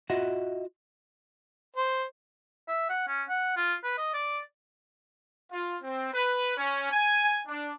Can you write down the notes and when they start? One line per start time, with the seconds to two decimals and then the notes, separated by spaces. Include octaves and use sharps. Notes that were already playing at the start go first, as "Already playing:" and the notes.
0.10 F4 F#4 D#5 E5 F#5
1.76 C5
2.68 E5
2.90 F#5
3.08 C#4
3.29 F#5
3.57 F4
3.84 B4
3.98 D#5
4.14 D5
5.52 F4
5.83 C4
6.14 B4
6.57 C#4
6.92 G#5
7.47 D4